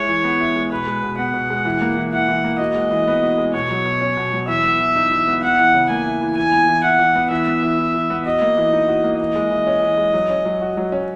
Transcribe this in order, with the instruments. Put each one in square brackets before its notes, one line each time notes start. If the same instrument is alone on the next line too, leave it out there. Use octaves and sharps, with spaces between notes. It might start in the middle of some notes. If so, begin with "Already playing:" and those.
Already playing: [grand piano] G#3 E4 [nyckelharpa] C#5
[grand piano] E3
B3
E4
G#3
[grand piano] B2 [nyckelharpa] B4
[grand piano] G#3
B2
[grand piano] B3 [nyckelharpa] F#5
[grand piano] B2
G#3
E3
A#3
E3
[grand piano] E4 [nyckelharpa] F#5
[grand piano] E3
A#3
[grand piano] F#4 [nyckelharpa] D#5
[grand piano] G#3
E3
B3
F#4
G#3
[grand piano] B2 [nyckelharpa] C#5
[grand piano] F#3
B2
C#4
B2
F#3
[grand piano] E3 [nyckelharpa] E5
[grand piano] B3
E3
D#4
E3
B3
[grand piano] E4 [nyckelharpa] F#5
[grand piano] E3
C#3
[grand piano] A#3 [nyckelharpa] G#5
[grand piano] E4
E3
[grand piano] E3 [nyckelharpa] G#5
[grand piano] B3
E3
[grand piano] E4 [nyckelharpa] F#5
[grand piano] E3
B3
[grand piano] E3 [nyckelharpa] E5
[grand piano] B3
E3
E4
E3
B3
[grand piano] F#4 [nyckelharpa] D#5
[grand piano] A#3
E3
D#4
F#4
A#3
[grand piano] E3 [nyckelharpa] D#5
[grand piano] G#3
E3
C#4
E3
G#3
F#3
C#4
F#3
F#4
F#3
C#4